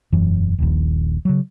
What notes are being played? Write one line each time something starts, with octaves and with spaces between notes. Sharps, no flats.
E1 F#2 E3 F#3
D#1 A#1 D#2
C#3 F#3